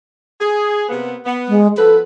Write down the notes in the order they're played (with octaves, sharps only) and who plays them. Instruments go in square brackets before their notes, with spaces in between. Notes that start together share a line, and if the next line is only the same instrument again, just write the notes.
[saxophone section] G#4
C3 A#3 B3
B3
[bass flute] G#3
[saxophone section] F3 B3 B4 [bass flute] A4